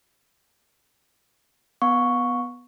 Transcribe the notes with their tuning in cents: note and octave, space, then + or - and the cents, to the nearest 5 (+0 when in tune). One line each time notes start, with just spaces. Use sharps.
B3 +0 F5 +45 C#6 +0